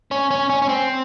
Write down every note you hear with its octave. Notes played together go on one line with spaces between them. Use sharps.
C#4
C#4
C#4
C#4
C4